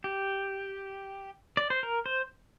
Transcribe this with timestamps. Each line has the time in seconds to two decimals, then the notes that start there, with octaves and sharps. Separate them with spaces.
0.04 G4
1.57 D5
1.70 C5
1.83 A#4
2.06 C5